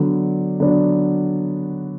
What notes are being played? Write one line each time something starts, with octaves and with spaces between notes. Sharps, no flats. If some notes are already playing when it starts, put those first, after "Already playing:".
Already playing: D3 F#3 B3 D4
D3 F#3 B3 D4